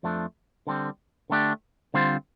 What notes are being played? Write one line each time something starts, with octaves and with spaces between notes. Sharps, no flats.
F2 F3 A3 D4
D3 G3 C4
D3 A3 D4 G4
D3 G3 C4 F4 C5